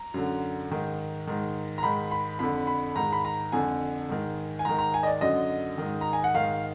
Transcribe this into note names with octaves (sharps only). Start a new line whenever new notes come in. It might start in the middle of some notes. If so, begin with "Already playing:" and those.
Already playing: A#5
F#2 D3
G#2 D#3
G#2 D#3
A#5
G#2 D#3 B5
B5
F2 D3 B5
B5
G#2 D#3 A#5
B5
A#5
F2 D3 G#5
G#2 D#3
G#5
G#2 D#3 A#5
A#5
G#5
D#5
D5
F#2 D3 D#5
G#2 D#3
A#5
G#5
F#5
G#2 D#3 F5